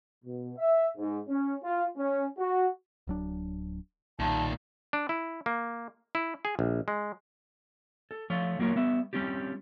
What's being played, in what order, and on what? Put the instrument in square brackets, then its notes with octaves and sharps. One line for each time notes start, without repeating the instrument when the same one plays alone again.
[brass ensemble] B2
E5
G#2
C#4
F4
C#4
F#4
[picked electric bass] D1 F#3 D4
[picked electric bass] B1 [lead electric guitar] A#2 D#3 [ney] A5
[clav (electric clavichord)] D4
E4
A#3
E4
G#4
A#1
G#3
[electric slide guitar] A4
F3 A3 F4 C#5
F#3 A#3 F4 A#4 C#5
G3 B3 E5
G3 C4 C#4 F4 G4